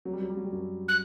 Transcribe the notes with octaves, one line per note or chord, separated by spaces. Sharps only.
F#3
G3
F#3
G3
F#3
G3
F#2 F#3
F#6